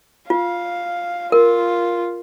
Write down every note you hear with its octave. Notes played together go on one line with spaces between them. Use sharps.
F4 F5
F4 A#4